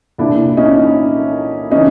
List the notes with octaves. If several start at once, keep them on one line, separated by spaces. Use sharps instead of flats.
C2 A#2 D4 E4
C#4 D#4
C#3 E3 C#4 D#4